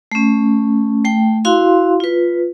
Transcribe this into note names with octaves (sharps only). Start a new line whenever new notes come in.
A3 C#4
A3 G5
E4 F#4 F5 C6
F4 B4